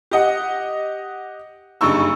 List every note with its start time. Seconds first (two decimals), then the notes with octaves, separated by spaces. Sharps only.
0.11 G4 D#5 F#5
1.81 F#1 G2 D#4 C#6 E6